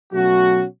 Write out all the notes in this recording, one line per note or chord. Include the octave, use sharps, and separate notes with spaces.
B2 F#3 A3 C#4 F#4